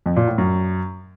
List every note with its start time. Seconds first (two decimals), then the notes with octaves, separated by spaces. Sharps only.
0.06 F2
0.16 A#2
0.27 A2
0.38 F#2